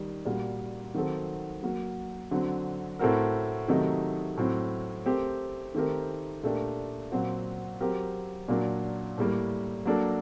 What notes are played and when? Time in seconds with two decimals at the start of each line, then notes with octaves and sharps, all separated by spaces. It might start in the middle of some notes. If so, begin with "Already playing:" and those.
Already playing: D#3 G3
0.25 A#2 G3 A#3 F#4
0.94 D#3 F#3 C4 F#4 A4
1.63 F#3 A#3 F#4
2.31 D3 F#3 C4
2.99 A2 A3 C4 F#4 A#4
3.68 C3 D#3 F#3 A3 D#4
4.37 A2 F#3 C4
5.06 A3 C4 G4 A#4
5.74 D#3 A3 C4 G4 A#4
6.43 A#2 A3 D4 G4 A#4
7.12 A#2 F#3 C4 F#4
7.80 F#3 C4 G4 A#4
8.48 A#2 F#3 A#3 D4
9.18 A2 G3 A#3
9.85 F#3 A#3 D4 A4